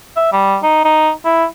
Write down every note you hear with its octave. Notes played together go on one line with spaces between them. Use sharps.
E5
G3
D#4
D#4
E4